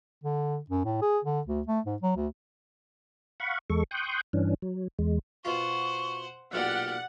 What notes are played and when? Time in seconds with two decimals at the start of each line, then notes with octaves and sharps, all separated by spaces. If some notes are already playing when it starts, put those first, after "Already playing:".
0.24 D3
0.70 F#2
0.85 A2
1.02 G#4
1.25 D3
1.47 D2
1.67 A3
1.86 G#2
2.02 F#3
2.17 D2
3.40 F5 F#5 B5 C#6
3.70 E2 G#3 A4 C#6
3.91 G5 C6 C#6 D#6 F#6 G6
4.33 G2 E3 C#4 D4
4.62 F#3
4.99 E2 G#3
5.45 B2 F4 C5 F#5 C#6
6.53 B1 A#2 G4 D5 F#5 F6